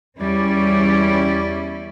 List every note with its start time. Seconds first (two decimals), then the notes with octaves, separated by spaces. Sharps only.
0.19 E2 G3 C#4 E4 D5